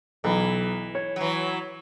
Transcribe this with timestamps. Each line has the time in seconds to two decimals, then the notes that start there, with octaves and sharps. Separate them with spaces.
0.24 B1 E3
0.95 C#5
1.16 E3 F#3